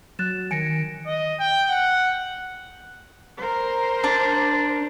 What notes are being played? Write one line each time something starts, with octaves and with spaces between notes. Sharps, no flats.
F#3 F#6 A6 E7
D#3 G#5 A#6 C#7 D7
D#5
G5
F#5
A#4 C5
D4